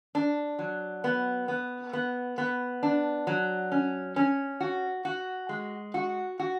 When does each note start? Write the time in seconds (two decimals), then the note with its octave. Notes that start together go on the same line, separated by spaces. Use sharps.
0.15 D4
0.59 F#3
1.04 B3
1.48 B3
1.93 B3
2.38 B3
2.83 D4
3.27 F#3
3.72 C#4
4.16 C#4
4.60 F#4
5.05 F#4
5.49 G#3
5.94 F#4
6.39 F#4